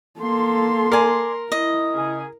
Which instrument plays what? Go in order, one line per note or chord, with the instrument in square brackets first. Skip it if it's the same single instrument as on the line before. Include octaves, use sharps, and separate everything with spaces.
[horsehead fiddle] A#3 A4 [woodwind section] C6
[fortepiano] A#4 [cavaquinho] D5 G#5
[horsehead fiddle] E4 [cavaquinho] D#5
[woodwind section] C#3 C#4 G#4